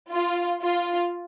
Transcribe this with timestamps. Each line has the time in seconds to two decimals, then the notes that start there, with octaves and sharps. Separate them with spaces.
0.11 F4
0.61 F4